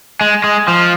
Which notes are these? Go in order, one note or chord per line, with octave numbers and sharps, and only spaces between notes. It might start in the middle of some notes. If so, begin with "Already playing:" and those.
G#3
G#3
F3